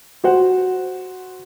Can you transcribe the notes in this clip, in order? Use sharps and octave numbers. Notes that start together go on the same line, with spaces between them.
F#4 C5 F#5